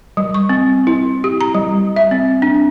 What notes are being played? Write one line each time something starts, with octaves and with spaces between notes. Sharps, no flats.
G3
C#6
C4
E4
G4
A#5
G3
E5
C4
D4